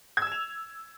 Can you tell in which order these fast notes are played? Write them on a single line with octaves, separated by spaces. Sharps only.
G#6 E6 E7 F7